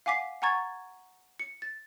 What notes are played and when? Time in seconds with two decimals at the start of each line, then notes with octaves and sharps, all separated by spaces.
0.06 F5 F#5 G#5 D6 B6 C7
0.42 F#5 G#5 A#5 C#6 G#6 A6
1.39 C#7
1.62 A6